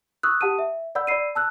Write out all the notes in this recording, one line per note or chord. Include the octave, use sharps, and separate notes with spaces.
C#6 D#6 E6 F#6
G4 F#5 A5 D#6 D#7
E5
D5 F#5 B5 E6 G6
D5 B5 E6 C7 D#7
A5 E6 F#6